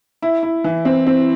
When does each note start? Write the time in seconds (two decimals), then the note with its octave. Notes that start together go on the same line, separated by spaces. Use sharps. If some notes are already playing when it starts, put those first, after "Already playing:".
0.22 E4
0.43 E4
0.64 E3
0.85 C4
1.07 C4